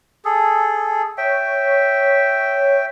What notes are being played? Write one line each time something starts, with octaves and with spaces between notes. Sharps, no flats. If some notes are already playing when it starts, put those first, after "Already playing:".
G#4 A4
C#5 E5 G5